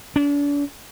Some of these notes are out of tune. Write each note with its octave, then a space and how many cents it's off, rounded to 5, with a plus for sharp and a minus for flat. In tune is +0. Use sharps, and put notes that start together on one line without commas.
D4 -40